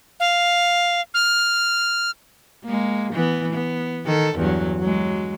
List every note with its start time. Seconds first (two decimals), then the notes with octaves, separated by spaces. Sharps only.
0.20 F5
1.14 F6
2.65 G#3 A#3
3.13 E3 B3
3.53 B3
4.06 D#3 A4
4.37 E2 G2 F#3
4.80 F#3 G#3